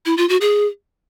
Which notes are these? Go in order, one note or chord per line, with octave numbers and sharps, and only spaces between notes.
E4
F4
F#4
G#4